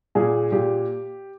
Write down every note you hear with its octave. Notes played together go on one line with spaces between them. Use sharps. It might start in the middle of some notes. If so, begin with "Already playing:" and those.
A#2 G#4
A#2 G4